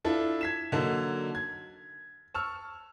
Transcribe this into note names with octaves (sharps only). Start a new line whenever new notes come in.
D4 E4 F4 A4
G#6 B6 E7
D3 F#3 A#3 D#4 A4
G#6
A5 C#6 E6 F6